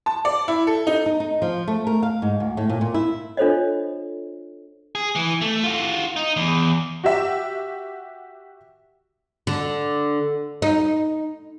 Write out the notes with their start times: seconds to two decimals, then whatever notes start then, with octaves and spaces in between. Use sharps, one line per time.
0.06 A5
0.25 D5
0.48 E4
0.67 A4
0.87 D#4
1.06 D#4
1.20 D#4
1.42 F3
1.68 A3
1.87 A#4
2.03 F5
2.22 G#2
2.40 D2
2.57 A2
2.69 A#2
2.81 A#2
2.94 E4
3.37 D4 F4 A4 C5 C#5 D#5
4.95 G#4
5.15 E3
5.41 A3
5.63 F4 F#4
6.16 D#4
6.37 E2
7.04 F#4 G4 E5
9.47 D3
10.62 D#4